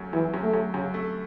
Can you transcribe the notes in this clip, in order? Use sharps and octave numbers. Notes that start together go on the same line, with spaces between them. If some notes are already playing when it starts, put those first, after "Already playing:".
Already playing: F#2 A3
F#2 E3
F#2
A3
F#2
F#2 C#3
A3